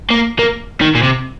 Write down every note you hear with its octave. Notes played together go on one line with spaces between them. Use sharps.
A#3
A#3
D#3
A#2
C3